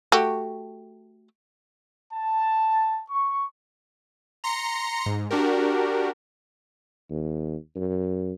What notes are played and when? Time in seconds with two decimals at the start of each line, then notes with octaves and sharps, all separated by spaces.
0.12 A3 F#4 G4
2.12 A5
3.10 C#6
4.44 A#5 C6 A#6 C#7
5.06 G#2
5.30 D4 F#4 G4 A#4
7.11 D#2
7.76 F#2